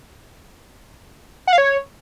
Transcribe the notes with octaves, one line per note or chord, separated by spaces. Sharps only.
F#5
F5
C#5